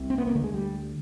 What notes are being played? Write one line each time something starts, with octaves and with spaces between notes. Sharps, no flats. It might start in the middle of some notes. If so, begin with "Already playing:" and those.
Already playing: C2 C3
C4
B3
A#3
D2 D3 A3
G#3
G3